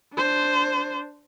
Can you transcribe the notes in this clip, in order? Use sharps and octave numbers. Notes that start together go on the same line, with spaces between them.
D4 C5